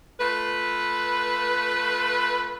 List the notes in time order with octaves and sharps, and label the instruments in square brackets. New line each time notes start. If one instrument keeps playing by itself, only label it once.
[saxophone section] A3 F4 B4